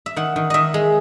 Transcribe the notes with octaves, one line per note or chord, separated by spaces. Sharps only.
E5
D#3 F#5
D#3
D#3 D#5 E5
G#3